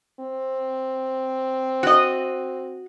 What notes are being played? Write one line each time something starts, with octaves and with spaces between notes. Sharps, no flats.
C4
F#4 D#5